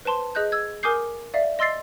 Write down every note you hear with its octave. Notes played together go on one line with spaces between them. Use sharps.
B4 C5 A5 C6
G#4 D#5 F#6 G6
E6 G#6
A#4 G#5 D6 D#6 G6 C7
D5 E5 F5
D#5 C6 E6 A6 C7